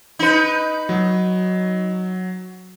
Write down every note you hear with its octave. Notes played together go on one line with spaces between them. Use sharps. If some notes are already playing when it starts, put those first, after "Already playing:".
D#4 B4
F#3